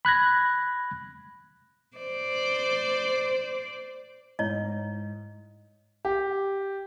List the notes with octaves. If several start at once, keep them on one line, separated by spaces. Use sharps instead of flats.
B5 F#6 G#6 A#6
C5 D5
G#2 E4 C#5 D#5
G4